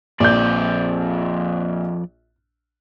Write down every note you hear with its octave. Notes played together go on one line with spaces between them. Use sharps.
A#1 F2 D5 G6